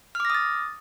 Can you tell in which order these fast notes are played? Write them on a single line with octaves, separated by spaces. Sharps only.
F6 D6 A#6 D#6 A6